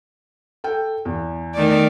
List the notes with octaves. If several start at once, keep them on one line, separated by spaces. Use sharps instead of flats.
A4 G5
E2
D#3 A3 D5